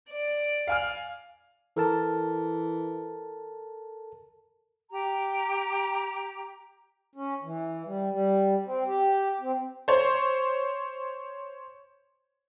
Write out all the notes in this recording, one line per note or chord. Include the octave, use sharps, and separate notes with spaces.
D5
F5 G#5 F6
E3 A4 A#4 A5
G4 A#5
C#4
E3
G3
G3
C4
G4
C4
C5 C#5